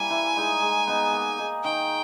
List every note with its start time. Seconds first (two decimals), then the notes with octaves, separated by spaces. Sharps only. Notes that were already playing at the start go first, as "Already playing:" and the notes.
Already playing: G3 A#3 E4 G#5
0.10 E3
0.36 G#3 D#4
0.62 G#3
0.87 B3 D#4
1.13 A#3
1.38 D#4 G#4
1.64 D#3 G5